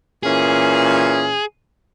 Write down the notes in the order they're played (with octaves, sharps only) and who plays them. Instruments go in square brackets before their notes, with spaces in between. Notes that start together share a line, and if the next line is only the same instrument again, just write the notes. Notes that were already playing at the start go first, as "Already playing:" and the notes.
[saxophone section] A#2 E3 C#4 [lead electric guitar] G#4